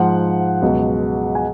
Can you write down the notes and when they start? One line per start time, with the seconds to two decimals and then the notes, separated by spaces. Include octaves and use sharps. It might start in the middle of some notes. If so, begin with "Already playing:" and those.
Already playing: G#2 F3 F#5
0.62 C#2 B2 F#3
1.35 G#5